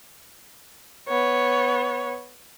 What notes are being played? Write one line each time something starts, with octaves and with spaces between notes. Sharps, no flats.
B3 C#5